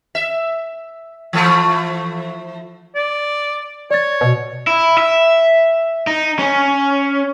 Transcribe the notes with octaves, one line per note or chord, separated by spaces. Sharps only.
E5
E3 F3 A3
D5
C#5 D5 A6
B2
E4
E5
D#4
C#4